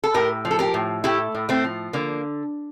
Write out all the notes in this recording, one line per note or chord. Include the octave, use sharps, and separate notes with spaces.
A4
A2 G4 A#4
F3
A4
G4 A#4
A2
A3 E4 G4
A2
A3 C4
F3
D3 A#3